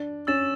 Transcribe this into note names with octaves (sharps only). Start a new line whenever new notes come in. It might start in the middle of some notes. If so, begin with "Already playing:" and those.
Already playing: D4
C#4 E6 A6 E7